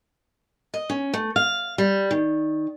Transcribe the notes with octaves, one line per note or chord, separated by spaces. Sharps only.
D#5
C#4
A3
F5
G3
D#3